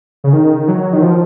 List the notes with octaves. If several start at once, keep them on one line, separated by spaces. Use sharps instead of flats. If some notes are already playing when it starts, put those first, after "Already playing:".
C#3
D#3
F#3
D#3
F3